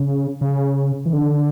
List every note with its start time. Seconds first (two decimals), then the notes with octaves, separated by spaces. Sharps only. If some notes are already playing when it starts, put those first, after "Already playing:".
Already playing: C#3
0.41 C#3
1.06 E3
1.13 D3